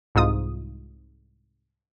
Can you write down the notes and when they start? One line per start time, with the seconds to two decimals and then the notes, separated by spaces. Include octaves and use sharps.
0.15 C2 G#2 D#4 F4 D#6